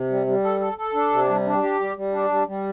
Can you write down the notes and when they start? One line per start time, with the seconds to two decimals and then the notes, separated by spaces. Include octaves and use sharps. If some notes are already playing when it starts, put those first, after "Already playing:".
Already playing: C3
0.10 G3
0.27 G3
0.44 A4
0.60 A4
0.78 A4
0.94 D4
1.11 C3
1.29 G3
1.46 D4
1.62 G4
1.80 G3
1.96 G3
2.13 D4
2.30 G3
2.47 G3